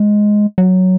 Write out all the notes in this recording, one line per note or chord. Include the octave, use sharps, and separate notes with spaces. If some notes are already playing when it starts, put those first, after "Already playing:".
Already playing: G#3
F#3